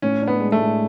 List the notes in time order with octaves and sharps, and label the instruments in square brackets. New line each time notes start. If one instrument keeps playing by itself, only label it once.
[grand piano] A2 [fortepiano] C#4
[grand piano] D4
[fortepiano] B3
[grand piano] G#3
[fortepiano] A3
[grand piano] A2